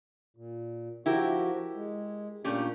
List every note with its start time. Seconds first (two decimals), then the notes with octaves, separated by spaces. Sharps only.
0.36 A#2
1.06 F3 E4 F#4 G4 A#4
1.75 G#3
2.44 A#2 A3 A#3 C#4 D4 G4